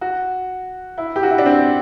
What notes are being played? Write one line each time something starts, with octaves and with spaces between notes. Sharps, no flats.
F#4
E4
G4
F#4
E4
D4
C4